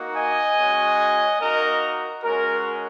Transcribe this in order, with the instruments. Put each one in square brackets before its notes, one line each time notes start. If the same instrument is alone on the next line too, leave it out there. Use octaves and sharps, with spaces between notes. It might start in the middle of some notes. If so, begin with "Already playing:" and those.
Already playing: [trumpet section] A#3 D#4 F#4
D#5 G#5
G#3 C#4 F#4
A#3 D#4 F#4 A#4 D#5
G#3 C#4 F#4 A#4